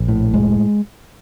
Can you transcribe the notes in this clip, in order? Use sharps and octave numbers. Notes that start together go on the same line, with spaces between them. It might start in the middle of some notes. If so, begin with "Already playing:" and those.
Already playing: A#1
A2
F1 G#3